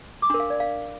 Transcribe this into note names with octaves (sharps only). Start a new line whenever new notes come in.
D6
D4 A#4 C6
F5
D5
F5